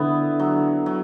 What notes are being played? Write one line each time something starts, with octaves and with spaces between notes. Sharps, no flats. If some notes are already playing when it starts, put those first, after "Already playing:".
Already playing: D3 B3 E4
F#3
F#3